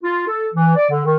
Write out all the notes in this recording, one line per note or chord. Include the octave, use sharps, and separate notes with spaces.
F4
A4
E3
D5
D3
D#3